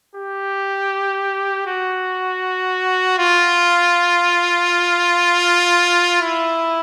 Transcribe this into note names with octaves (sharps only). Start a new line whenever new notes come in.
G4
F#4
F4
E4